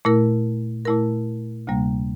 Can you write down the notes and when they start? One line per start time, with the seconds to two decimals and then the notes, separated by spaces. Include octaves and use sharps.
0.05 A#2 A3 E4 A#4
0.85 A#2 A3 E4 A#4
1.67 D2 C3 G3 A#3